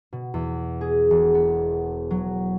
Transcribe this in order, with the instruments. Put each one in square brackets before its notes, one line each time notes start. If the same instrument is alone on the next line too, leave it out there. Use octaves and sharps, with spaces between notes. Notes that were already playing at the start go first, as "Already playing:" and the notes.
[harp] B2
E2
G#4
E1
B3
F#3